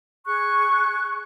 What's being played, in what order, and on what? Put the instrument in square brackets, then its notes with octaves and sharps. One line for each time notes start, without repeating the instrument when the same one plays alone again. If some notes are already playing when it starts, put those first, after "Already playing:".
[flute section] G#4 C#6 F#6